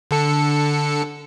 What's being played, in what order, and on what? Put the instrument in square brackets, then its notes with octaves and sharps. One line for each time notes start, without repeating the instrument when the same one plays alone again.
[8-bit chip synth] D3 A4 C#7